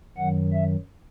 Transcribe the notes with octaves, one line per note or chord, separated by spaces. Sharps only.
F#2 D#3 F#3 F#5
E5